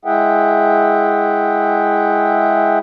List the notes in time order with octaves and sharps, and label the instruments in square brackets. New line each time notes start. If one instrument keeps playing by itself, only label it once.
[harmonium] G#3 E4 G#4 E5 F#5 G5